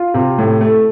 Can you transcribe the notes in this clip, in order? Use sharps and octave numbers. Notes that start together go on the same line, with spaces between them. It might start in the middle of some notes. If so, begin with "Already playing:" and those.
Already playing: F4
C3
A2
A3